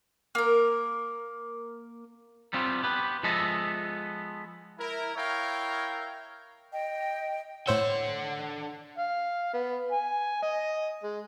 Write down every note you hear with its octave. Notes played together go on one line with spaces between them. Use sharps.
A#3 A#4
G3 B3 C4 F4
B3 G4 B4
F3 G#3 B3 A4 D#5 E5
E4 A#4
E4 A#4 C#5 E5 F5 G5
D#5 G5
A2 D3 C5 C#5 F#5 E6
F5
B3
G#5
D#5
G#3